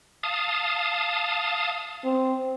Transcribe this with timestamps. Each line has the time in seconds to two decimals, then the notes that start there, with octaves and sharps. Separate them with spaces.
0.23 F5 A5 D#6
2.04 C4